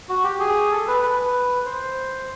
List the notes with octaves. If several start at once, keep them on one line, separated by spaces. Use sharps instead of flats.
F#4
G4
G#4
A4
B4
B4
C5